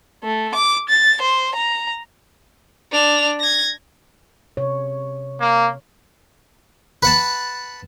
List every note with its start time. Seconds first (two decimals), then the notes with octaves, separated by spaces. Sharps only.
0.24 A3
0.54 D6
0.89 A6
1.22 C5
1.55 A#5
2.92 D4 F7
3.40 G#6 A#6
4.57 C3 C#5
5.40 A#3
7.03 B4 F#5 A5